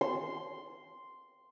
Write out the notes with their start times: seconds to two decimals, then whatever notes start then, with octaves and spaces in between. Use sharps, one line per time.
0.01 C6